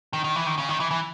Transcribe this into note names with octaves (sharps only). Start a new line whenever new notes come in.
D#3
D#3
E3
D#3
C#3
D#3
E3
E3